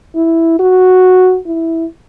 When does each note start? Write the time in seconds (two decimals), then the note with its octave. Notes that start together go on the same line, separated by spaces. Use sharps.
0.15 E4
0.59 F#4
1.46 E4